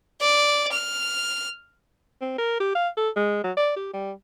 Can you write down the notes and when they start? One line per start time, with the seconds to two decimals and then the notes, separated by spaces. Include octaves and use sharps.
0.21 D5
0.73 F6
2.21 C4
2.38 A#4
2.60 G4
2.75 F5
2.97 A4
3.16 G#3
3.44 F#3
3.57 D5
3.76 G4
3.93 G3